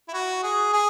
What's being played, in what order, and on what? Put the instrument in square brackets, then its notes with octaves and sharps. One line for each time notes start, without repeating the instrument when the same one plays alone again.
[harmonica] E4
F#4
G#4
G#4